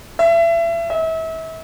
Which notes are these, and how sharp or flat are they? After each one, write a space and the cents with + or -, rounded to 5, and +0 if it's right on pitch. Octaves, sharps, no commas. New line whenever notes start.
E5 +30
E5 -35